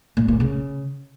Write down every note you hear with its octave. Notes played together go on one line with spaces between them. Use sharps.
A#2
A#2
C#3